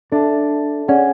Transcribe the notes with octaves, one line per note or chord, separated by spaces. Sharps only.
D4 A4 E5 A5
C#4 G#4 D5 F#5